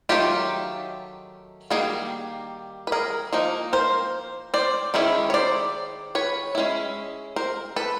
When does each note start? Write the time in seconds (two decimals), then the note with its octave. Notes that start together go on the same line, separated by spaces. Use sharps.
0.09 D#3 F#3 A3 F4 G4
1.70 D#3 G3 A#3 F#4 G#4
2.87 B4
2.92 G#4 A#4
3.33 F3 A#3 D#4
3.73 A#4 C5
4.54 C5 D5
4.94 D#3 G#3 C#4 E4
5.30 C#5
5.34 C5 D5
6.15 B4 C#5
6.55 G#3 C#4 E4
7.36 A#4 C5
7.76 A4 B4